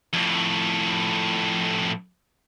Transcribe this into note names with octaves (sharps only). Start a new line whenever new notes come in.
F2 A2